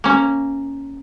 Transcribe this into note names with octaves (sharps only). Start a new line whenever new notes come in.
A#3 C#4